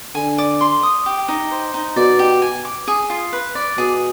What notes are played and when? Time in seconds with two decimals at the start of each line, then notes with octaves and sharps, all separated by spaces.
0.15 D3 G#5
0.38 D5
0.61 C6
0.83 D#6
1.06 G4
1.28 D#4
1.51 C5
1.74 D#4
1.96 B2 D5
2.19 G4
2.42 G#5
2.65 D6
2.88 G#4
3.10 F4
3.33 B4
3.55 D5
3.78 B2 G#4